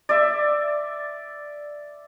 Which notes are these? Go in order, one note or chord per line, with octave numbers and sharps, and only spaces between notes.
D5 E5